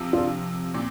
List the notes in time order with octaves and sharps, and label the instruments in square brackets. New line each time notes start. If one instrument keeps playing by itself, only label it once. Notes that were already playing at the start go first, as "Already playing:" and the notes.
Already playing: [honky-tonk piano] C3 F3 C4
[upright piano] D4 F4
[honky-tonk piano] A#2 C4